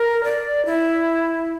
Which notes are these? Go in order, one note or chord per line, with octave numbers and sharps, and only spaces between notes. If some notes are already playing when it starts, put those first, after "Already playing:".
Already playing: A#4
D5
E4